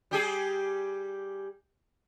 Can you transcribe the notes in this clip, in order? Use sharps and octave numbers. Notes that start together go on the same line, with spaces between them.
G3 G4 G#4